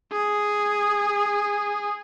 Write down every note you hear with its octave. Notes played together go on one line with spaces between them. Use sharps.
G#4